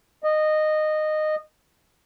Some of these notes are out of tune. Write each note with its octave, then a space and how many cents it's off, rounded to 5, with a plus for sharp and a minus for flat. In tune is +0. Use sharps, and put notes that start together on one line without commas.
D#5 -15